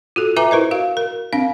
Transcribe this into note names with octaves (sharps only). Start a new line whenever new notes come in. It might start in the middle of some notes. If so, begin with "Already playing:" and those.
F4 F#4 A4
F4 B4 E5 G#5 A#5 D6
E4 A#4 C5 D#5
F#4 F5
A#4
C4 D4 F5